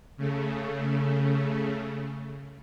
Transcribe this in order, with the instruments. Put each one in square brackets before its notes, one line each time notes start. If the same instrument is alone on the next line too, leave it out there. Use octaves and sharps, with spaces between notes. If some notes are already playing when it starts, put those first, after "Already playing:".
[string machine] C#3 A3